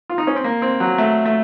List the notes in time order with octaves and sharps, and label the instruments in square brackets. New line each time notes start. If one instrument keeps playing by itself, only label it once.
[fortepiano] F4
D#4
C#4
C4
A#3
C4
F#3
A3
A3